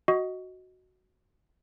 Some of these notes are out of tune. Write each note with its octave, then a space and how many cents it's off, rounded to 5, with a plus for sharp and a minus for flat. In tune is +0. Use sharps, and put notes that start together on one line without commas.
F#4 +0 D#5 +10